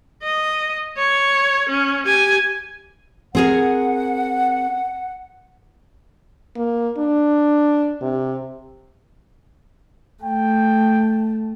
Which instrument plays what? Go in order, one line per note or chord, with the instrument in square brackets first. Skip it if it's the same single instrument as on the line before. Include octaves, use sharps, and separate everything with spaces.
[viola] D#5
C#5
C#4
G4 G#5
[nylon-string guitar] C4 G#4 A#4 [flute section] F#5
[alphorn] A#3
D4
C3
[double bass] A3 [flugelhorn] G5